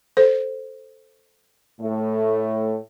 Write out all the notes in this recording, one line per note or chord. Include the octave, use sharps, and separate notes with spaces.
A4 C5
A2 A3